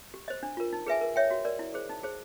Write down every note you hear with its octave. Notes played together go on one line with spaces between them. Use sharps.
G4
C5 D#5
D4
F4 A#4
D#4
G#4 B4 E5 G#5
A#4
C#5 E5 G5
F#4
A#4 D5
E4
G#4 C5
D#4
G#4 C5